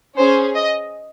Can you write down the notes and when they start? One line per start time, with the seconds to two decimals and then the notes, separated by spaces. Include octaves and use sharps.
0.17 C#4 G#4 C5
0.55 D#5